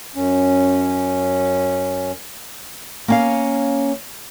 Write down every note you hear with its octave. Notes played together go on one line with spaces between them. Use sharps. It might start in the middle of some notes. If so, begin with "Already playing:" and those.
F#2 C#4
A#3 C#4 F5